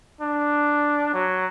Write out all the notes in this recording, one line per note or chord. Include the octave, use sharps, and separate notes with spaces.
D4
F#3